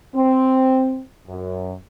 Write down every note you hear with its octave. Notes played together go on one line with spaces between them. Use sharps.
C4
F#2